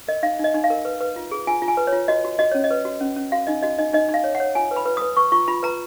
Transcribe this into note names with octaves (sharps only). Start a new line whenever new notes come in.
A#4 D#5
D#4 F5
D#4 D#5
D#4
F5
A#4
B4
B4
F4
G#4
F4 G#5
F4
G#5
B4
C#5
F4
F#4 D#5
F#4
F#4 D#5
C#4 C#5
D#5
B4
F#4
C#4
C#4
F#4 F5
D#4 D#5
F#4 D#5
D#4 D#5
D#4 D#5
D#4
F5
C#5
F#5
C#5
F4 G#5
B4
B5
B4
B4 D#6
B4 C#6
F4 C#6
F4 B5
B4 A#5